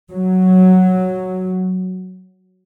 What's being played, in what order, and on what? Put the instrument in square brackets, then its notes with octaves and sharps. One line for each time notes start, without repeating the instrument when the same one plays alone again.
[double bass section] F#3